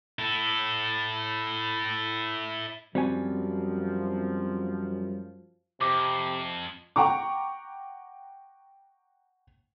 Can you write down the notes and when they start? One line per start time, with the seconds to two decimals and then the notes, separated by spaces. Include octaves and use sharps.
0.19 E4 A4
2.95 F#2 F3 G3 C4 F#4 G#5
5.81 F2 C3 D6
6.96 F#5 G5 A#5 C#6 D6